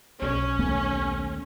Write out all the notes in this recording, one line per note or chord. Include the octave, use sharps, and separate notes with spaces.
B1 C#4
D#2 A3 B3